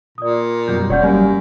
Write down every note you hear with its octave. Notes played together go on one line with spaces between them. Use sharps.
A#2 D5 D#6
F#2 B2 G3 G6
E1 F#2 C#4 C#5 D5 F#5 G6
F#3 G3 A#3 G#5